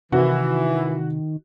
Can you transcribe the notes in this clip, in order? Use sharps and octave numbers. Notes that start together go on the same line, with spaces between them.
C3 D#3 E3 F#4